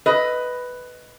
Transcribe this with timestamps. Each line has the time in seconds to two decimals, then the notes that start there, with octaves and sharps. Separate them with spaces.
0.06 B4 D#5